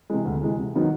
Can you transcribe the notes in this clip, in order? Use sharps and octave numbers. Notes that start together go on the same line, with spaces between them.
C3 E3 G#3
D2
C3 E3 G#3
C3
D#3 F#3 B3 D#4